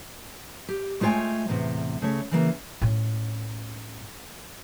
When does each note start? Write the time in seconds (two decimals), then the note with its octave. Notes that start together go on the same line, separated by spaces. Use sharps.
0.69 G4
1.01 G#3 A3 F4 C#5 G5 G#5
1.48 E2 A2 C3
2.02 C#3 A3 C#5
2.31 C#3 E3 A#3
2.81 A2 C#4